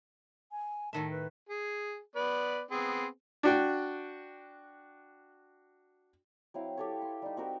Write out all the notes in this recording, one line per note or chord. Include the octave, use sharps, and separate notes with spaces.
G#5
A2 D#3 E5 A5
B4
G#4
B3 B4 D5
B3 C4 G#4
D4 F#4 G5
F#3 C4 E4 F5
G4 A4 C#5
C6
G3 D#4
C4 F#4 A#4